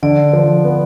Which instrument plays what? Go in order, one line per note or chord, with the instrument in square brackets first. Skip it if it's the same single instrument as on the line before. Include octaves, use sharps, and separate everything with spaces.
[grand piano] D3 [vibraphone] D5
[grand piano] F3
B3